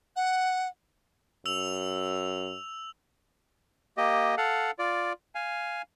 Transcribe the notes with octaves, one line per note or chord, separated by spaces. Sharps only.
F#5
F#2 E6 F7
A#3 G4 D#5
A4 F5 F#5
F4 D5
F5 G#5